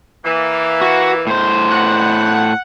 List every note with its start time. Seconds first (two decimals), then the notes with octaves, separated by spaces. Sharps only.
0.25 E3 A#3
0.81 F#4
1.27 A2 C5
1.70 F#5